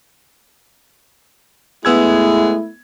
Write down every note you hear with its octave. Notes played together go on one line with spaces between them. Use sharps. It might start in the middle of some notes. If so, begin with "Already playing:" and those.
G#3 A3 B3 E4 E6 G#6